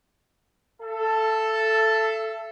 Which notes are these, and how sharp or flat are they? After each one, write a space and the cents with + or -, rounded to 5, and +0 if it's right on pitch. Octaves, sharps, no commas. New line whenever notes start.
A4 +0 E5 +35